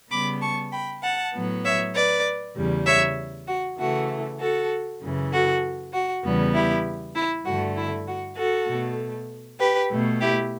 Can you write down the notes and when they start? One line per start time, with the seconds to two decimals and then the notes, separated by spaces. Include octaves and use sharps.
0.11 C#3 G3 B3 B5 D6
0.42 A5 C#6
0.72 G5 B5
1.03 F#5 A5
1.34 A2 F#3 B3
1.65 C#5 E5
1.95 B4 D5
2.56 E2 C#3 G3
2.86 C#5 E5
3.48 F#4
3.79 C#3 E3 A3 F#4
4.40 F#4 A4
5.02 F#2 C#3 E3
5.32 F#4 A4
5.93 F#4
6.24 E2 C#3 G3 B3
6.54 E4 G4
7.16 E4
7.45 G2 D3 A3 F#4
7.77 E4
8.08 F#4
8.37 F#4 A4
8.68 B2 A3
9.60 G4 B4
9.91 B2 A3
10.21 E4 G4